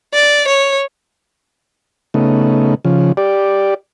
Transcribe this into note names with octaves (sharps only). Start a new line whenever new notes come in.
D5
C#5
C#3 A3 B3 D#4
C#3 F3
G4 D5